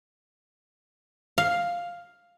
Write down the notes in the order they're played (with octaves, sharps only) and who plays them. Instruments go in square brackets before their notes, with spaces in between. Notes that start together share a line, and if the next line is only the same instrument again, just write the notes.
[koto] F5